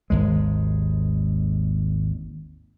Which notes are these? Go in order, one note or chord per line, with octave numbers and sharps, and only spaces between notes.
G#1 D#2 G#3